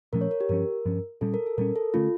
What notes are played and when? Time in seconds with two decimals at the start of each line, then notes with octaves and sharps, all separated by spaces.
0.13 A#2 F3 A3 C#4 A#4
0.21 C#5
0.31 A#4
0.41 G4
0.49 G2 F3 C#4 A#4
0.85 G2 F3 C#4
1.21 A#2 G3 C#4 A4
1.34 A#4
1.46 A4
1.58 A#2 G3 C#4 A#4
1.76 A4
1.94 D3 A3 C#4 F4